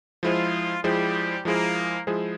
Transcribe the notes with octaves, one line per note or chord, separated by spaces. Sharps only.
F3 G#3 E4 F4 G#4 C5
F3 G3 G#3 E4 G4 G#4 C5
F3 G#3 A#3 E4 G#4 C5
F3 G#3 E4 G#4 C5